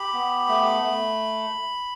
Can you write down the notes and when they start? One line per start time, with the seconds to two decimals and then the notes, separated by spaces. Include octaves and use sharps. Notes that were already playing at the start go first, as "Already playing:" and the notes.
Already playing: G4 B5
0.13 B3
0.48 A3
0.83 A3